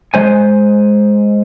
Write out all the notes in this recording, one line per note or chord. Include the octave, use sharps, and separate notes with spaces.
G#3 C5 G#5